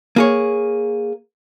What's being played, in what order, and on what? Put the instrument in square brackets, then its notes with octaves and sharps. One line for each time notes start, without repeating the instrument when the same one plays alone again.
[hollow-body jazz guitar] A#3 G#4 C#5